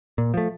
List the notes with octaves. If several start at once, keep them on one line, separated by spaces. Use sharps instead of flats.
A#2
F3 A3